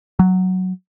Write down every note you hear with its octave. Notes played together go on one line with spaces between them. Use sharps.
F#3